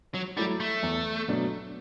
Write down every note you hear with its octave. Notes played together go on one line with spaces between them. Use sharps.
F#3
F#3 G3 A3 E4
A3
E2
B2 F#3 A3 D4